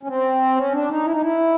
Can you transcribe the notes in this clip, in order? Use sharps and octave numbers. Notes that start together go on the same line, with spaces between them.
C#4
C4
C#4
D4
D#4
E4
D#4
E4